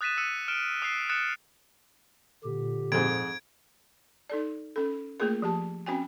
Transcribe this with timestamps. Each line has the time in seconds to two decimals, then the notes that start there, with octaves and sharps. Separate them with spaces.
0.01 D#6 F#6 A6 B6 D#7 E7
0.17 E6 C#7 D#7
0.48 F6 D7 E7
0.82 D#6 F#6 C7 D#7
1.09 D#6 F#6 A6 C#7 E7
2.44 A#2 D3 G4
2.92 F2 G#2 G#6 D7
4.30 D#4 A4 D5
4.76 C#4 A4
5.20 A3 A#3 F4 G#4 A#4
5.42 F3 G4 A5
5.86 C4 C#4 F#4 G5 G#5